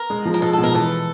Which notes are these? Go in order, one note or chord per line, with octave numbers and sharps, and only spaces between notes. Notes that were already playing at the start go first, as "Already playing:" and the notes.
Already playing: A#4
G#3
F3
A#4
G#3 A4
A4
B2
A#4
E3 A4